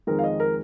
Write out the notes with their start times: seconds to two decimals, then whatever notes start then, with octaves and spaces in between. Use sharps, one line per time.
0.07 F2 D#3 G#3 A#4
0.19 F5
0.24 D#5
0.40 A#4